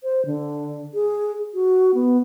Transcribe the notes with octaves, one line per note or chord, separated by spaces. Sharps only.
C5
D3
G#4
F#4
B3